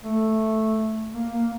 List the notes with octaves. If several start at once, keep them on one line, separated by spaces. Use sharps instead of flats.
A3
A#3
A#3